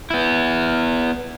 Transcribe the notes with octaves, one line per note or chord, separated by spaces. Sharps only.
B3 E4